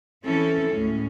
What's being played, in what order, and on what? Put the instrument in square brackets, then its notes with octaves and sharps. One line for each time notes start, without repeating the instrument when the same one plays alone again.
[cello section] E3 C4 C#4 E4 A4
D2 A2 G#3 C#4